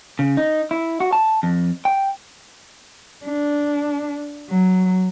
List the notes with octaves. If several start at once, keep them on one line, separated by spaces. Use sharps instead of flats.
C#3
D#4
E4
F#4
A5
F2
G5
D4
F#3